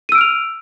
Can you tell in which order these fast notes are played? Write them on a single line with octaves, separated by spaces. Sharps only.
D#7 E6 D7 F6 F7